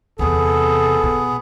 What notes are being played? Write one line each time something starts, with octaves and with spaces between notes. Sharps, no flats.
E2 C3 B3 G#4 A4
B2